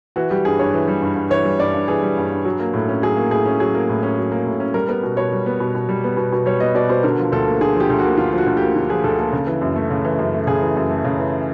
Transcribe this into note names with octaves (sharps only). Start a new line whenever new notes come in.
E3 F#4
G3 G4
G2 G#4
G2 C#5
E3
G3
G2
G2
E3 C#5
G3
G2 D5
G2
E3 G#4
G3
G2
G2
F#3
A#3
A2
C#4
F#3 G#4
A#3
A2 G#4
C#4
F#3 G#4
A#3
A2
C#4
F#3
A#3
A2
C#4
G3 A#4
B3 A#4
B2
B2 C#5
G3
B3
B2
B2
G3
B3
B2
B2
G3 C#5
B3 D#5
B2 D5
B2 C5
D3 A#4
F3
D2 A4
A#3
D3 G#4
F3 G4
D2
A#3 F#4
D3 F4
F3 F4
F#4
D2
A#3 G4
D3
F3 G#4
D2 A4
A#3 A4
C#3
E3
F#2
A3
C#3
E3
F#2
A3
C#3 G#4
E3
F#2
A3
C#3
E3